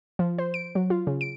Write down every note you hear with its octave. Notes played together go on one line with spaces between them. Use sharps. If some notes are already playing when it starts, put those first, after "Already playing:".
F3
C5
D7
F#3
F4
C#3
D7